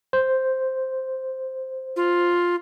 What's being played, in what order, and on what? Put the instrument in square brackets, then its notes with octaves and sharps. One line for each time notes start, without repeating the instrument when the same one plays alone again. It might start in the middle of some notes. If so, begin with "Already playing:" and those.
[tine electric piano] C5
[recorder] F4